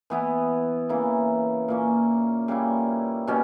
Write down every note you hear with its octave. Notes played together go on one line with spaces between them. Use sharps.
E3 B3 E4
C#3 E3 A#3 E4
A#2 A#3 C#4
C#3 G3 A#3 E4
B2 G3 C#4